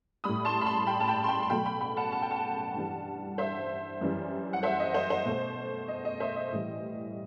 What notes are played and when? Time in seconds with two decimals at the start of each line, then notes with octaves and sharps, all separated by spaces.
0.24 A2 G3 B5 D#6
0.45 A5 C6
0.61 B5
0.66 A5 C6
0.87 G5 B5
1.00 A5
1.08 G5 B5
1.24 C6
1.28 G5 B5
1.42 C6
1.50 B2 F#3 A3 G5 B5
1.66 G5 B5
1.81 G5 B5
1.97 F#5 A5
2.12 A5
2.22 G5
2.31 F#5 A5
2.75 G2 E3 G3
3.38 C5 E5
4.01 F#2 E3 G3
4.53 F#5
4.63 C5 E5
4.80 D#5
4.94 C5
5.10 C5
5.25 B2 A3
5.88 D#5
6.05 D#5
6.20 C5 E5
6.36 D#5
6.52 A2 E3 G3